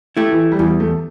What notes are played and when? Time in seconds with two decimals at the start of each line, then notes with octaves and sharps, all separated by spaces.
0.17 A3 E4 G4
0.31 E3
0.52 G3
0.59 E2 E3
0.80 A3